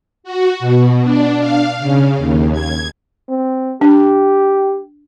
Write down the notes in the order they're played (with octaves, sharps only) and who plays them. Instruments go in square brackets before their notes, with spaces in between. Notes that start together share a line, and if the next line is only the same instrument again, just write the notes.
[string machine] F#4
B2
D4
F5
C#3
D#2
G#6
[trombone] C4
[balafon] D4 [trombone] G4